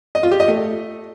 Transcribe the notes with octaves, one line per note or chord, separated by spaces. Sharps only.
D#5
F4
G4
D#5
A3